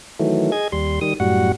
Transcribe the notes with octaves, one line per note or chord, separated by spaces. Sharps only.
D#3 E3 F#3 A3
G#4 D#5 G#6
D#2 G3 C6
D#3 G3 D#6
F#2 A2 G3 F#4 F#5